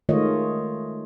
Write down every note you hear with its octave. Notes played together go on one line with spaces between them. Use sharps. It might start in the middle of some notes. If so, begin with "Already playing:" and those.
D#3 G#3 A3 F4 C#5 D#5